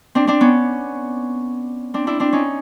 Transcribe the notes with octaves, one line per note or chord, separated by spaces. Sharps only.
C4 D4
C4 D4
B3 C#4
C4 D4
D4 E4
C4 D4
C#4 D#4